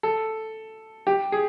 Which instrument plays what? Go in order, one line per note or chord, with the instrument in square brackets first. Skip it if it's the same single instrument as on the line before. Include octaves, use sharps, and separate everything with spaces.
[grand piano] A4
G4
G#4